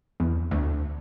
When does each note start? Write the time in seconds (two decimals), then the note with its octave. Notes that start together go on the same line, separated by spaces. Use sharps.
0.20 E2
0.51 D2